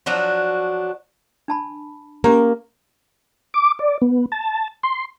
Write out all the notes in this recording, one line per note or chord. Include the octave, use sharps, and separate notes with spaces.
F3 F#3 D4 F#4
D4 A5 B5
A#3 C#4 G4 A#5
D6
D5
B3
A5
C6